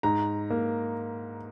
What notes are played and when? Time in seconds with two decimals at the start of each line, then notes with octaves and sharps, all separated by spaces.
0.03 G#2 A#5
0.50 A#3